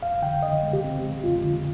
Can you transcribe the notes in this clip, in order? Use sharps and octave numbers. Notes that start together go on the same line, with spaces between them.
F2 F5
D3 G5
D3 D#5
G#3
G4
C4
G#3
F2 F4
D3